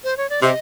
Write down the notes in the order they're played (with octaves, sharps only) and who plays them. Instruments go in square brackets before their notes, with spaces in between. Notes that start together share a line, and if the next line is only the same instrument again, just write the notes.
[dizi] C5
C#5
D5
[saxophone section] C3 [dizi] D#5